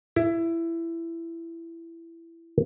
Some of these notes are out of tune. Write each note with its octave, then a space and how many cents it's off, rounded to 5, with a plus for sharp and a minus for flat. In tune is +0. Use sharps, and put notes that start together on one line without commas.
E4 +15